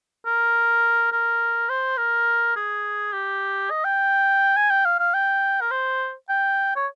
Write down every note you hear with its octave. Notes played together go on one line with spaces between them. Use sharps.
A#4
A#4
C5
A#4
G#4
G4
D#5
G5
G#5
G5
F5
F5
G5
A#4
C5
G5
C#5